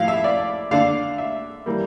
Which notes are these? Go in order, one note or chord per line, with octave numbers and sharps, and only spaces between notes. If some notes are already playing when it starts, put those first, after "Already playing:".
Already playing: A2 F3 A3 F5
E5
D5
D3 A3 D4 F5
E5
E3 G3 A#3